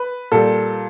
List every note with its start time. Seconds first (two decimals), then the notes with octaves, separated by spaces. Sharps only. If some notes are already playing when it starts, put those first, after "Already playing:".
Already playing: B4
0.32 A#2 G3 A4